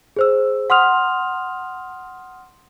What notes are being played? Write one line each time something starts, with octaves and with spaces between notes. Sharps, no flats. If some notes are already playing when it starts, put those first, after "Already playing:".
G#4 C5 E6
F#5 C6 D#6 F6 F7